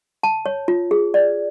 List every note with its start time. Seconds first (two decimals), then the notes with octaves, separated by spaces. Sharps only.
0.23 A5
0.46 C#5
0.68 F4
0.91 G#4
1.14 D5